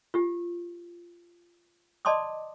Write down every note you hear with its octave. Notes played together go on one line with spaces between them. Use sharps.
F4 G4
D5 D#5 A5 C6 D6 D#6